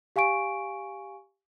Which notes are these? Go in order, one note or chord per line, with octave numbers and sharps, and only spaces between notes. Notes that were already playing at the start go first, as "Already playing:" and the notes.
G4 F5 G#5 C#6 D7